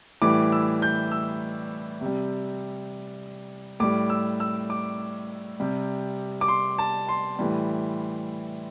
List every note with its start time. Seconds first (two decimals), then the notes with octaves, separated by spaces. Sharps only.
0.22 A2 E3 G3 D6
0.52 E6
0.82 G6
1.12 E6
2.01 C3 G3
3.80 A2 G3 D6
4.10 E6
4.40 E6
4.70 D6
5.60 C3 G3
6.41 D6
6.48 C6
6.79 A5
7.08 C6
7.39 A2 E3 G3